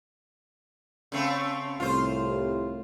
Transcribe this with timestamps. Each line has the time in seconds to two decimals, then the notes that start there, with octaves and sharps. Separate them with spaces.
1.12 C#3 A3 C4
1.80 C2 A2 F4 C5